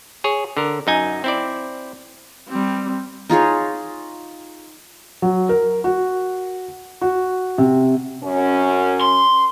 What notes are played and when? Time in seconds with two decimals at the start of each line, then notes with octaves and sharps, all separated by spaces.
0.24 G#4 C#5
0.57 D3 A#4
0.87 F#2 D#4 G#5
1.24 C4 E4 D5
2.49 G3 C4
3.29 D#4 F4 G#4 C#5
5.22 F#3
5.49 A#4
5.84 F#4
7.01 F#4
7.58 C3
8.23 F#2 C#4
9.01 C6